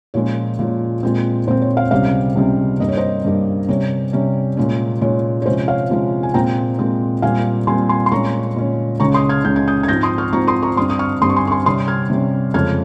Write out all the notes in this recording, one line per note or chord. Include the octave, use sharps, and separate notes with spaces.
A#2 F3 G#3 C#4 C#5
A#2 F3 G#3 C#4
A#2 G#3 C4
A#2 G#3 C4 C5
C#5
C#5 F5
C#2 C3 G3 C4 C#5 F5
C#2 C3 G3 C4
G2 G3 A#3 D#5
C#5
C5 D#5
G2 G3 A#3
C3 G3 C#4 C#5
C3 G3 C#4
A#2 G#3 C#4
A#2 G#3 C#4 C#5
C#5
C3 F3 G#3 C#4 C5
C#5 F5
C3 F3 G#3 C#4
G#5
A#2 G#3 C4 G5 A#5
A#2 G#3 C4
A#2 G3 C4 F5 G#5
A#2 G3 C4 G#5 C6
G#5 C6
C6
A#2 G#3 C#4 A#5 C#6
A#2 G#3 C#4
C#2 C#3 G#3 C#4 A#5 C#6
C6 D#6
F6 G#6
C#2 C#3 G#3 C#4 G6
G#6
D#6 G6
G#6
G#2 F3 C4 G6 A#6
C6 D#6
C#6 F6
G#2 F3 C4 A#5 C#6
C6 D#6
A#5 C#6
G2 G3 C4 C6 D#6
D#6
C#6 F6
G2 G3 C4 C6 D#6
C#6
G#5 C6
C#6
G#5 C6
C3 G3 C#4 C6 D#6
F6 G#6
C3 G3 C#4
F2 C#3 G#3 C#4 F6 G#6